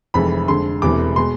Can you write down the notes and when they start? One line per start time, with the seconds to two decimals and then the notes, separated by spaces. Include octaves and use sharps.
0.14 F1 F2 E3 G#3 B5
0.48 F2 D3 G#3 C6
0.82 E1 E2 C3 E3 A3 D6
1.16 B2 G#3 C6